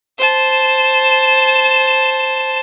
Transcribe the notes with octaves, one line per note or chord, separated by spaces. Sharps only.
C5 A5